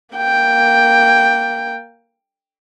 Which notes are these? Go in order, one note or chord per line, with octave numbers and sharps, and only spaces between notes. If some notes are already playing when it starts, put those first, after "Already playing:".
A#3 G5